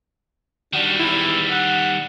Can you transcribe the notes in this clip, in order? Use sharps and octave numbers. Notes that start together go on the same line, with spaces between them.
D#3 G3 D4 F#4
E2 E4
F#5